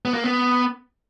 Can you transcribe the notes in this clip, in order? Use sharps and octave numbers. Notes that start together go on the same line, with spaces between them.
B3
A#3
B3